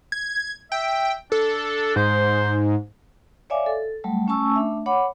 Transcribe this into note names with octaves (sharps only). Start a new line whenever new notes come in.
G#6
E5 G5
D4 A4
G#2 C5
C#5 D5 E5 F5 G#5 D6
A4
F#3 G3 A3
A3 C#4 G#5 A5 C#6 E6
A3 D4 E5
C#5 F#5 B5 D6